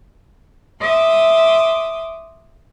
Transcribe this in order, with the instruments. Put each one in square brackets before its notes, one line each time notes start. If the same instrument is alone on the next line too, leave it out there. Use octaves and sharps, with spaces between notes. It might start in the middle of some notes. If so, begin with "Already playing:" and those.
[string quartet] E5 C6 D6 D#6